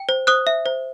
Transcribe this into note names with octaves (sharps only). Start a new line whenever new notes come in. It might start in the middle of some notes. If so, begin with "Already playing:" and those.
Already playing: G5
C5
C5 D#6 F#6
E5
C5